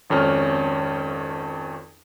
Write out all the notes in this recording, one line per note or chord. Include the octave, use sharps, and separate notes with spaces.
G#1 F2 C#4 F6